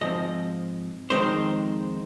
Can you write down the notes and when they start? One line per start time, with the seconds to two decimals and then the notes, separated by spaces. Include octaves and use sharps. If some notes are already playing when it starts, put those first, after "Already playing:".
0.01 G#2 F3 C4 D#5
1.10 F2 D#3 G#3 C4 D#4 C5